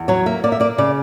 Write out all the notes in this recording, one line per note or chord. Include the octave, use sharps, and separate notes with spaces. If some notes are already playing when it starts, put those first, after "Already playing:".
Already playing: E2
F#3 C#5
A#3 E5
A#3 D5
E5
A#3 D5
C#3 D5